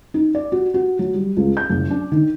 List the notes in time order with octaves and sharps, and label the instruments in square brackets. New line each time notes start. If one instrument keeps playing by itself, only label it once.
[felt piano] D#4
D5
F#4
F#4
F#3
G3
C#2
G6
F#1
D4
D#3